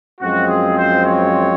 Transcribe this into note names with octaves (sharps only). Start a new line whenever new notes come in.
F#2 F3 G#3 C4 F#4
G#4
C5
C#5